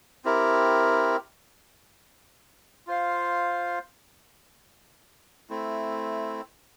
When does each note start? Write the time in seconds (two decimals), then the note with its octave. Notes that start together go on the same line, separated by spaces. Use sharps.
0.25 C4 E4 G4 A#4
2.87 F4 C5 F5
5.50 A3 C4 E4